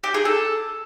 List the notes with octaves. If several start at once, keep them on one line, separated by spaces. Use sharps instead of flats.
G4
G#4
A4